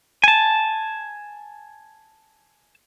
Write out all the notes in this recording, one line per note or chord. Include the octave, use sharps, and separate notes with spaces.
G#5 A5